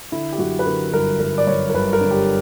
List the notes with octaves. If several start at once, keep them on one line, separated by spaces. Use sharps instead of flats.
D3 E4
G4
F#2 F#4
B4
D3 A#4
G1 A#4
G1 A#4
D5
F#2 C#5
A#4
G1 B4
A#4
D3
G4